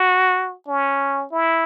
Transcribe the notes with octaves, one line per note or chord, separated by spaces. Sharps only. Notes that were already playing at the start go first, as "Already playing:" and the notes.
Already playing: F#4
C#4
E4